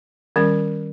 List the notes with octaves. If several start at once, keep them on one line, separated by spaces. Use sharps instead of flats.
D#3 G3 C#4